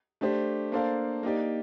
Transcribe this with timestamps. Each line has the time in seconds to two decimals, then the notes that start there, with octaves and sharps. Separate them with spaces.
0.21 A3 D4 G4 C5
0.72 A#3 D4 A4 C5 F5
1.23 A#3 D#4 G4 D5